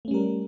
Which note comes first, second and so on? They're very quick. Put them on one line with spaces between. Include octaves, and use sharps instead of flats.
A3 C#4 G3 A#4